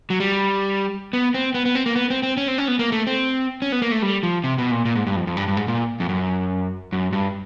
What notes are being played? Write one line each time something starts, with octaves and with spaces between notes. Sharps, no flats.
F#3
G3
B3
C4
B3
B3
C4
A#3
B3
C4
C4
C#4
C4
C#4
B3
A#3
A3
C4
C#4
B3
A#3
A3
G3
F3
C3
B2
A#2
A#2
G#2
G2
F2
F2
G2
G2
G#2
A#2
F2
F#2
F#2
G2